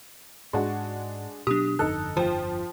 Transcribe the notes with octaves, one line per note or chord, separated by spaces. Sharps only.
G#2 G#3 D4 F#4
B2 F#3 D4 G4 D#6
G1 F2 D3 D#4 A4 F#6
F3 F4 C5 G5